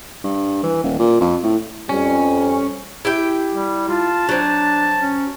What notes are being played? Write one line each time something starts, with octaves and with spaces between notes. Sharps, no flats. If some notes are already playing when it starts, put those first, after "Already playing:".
G2
E3
D#1
A#2
F2
A2
F2 G3 C#4
E4 G4 G5
G3
F4 A5
F#3 C4 D4
C#4